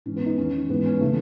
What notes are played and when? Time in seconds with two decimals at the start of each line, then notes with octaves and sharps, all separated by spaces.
0.06 G#2 E3 C#4
0.16 B3
0.26 D#4
0.38 E2 D#3 C#4
0.69 G#2 E3 B3
0.86 C#4
1.01 C#3 E3 A3